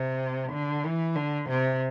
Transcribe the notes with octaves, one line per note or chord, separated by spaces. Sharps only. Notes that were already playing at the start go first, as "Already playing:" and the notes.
Already playing: C3
D3
E3
D3
C3